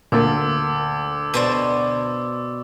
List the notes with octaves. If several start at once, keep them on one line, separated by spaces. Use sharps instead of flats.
D2 A#2 A#3 D6 E6 A6
B2 C5 D5